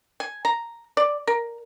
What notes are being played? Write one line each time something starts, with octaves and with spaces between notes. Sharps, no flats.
G#5
A#5
D5
A#4